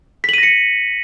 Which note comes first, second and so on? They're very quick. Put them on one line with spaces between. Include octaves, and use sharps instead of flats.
B6 F#7 D#7 A#6 C#7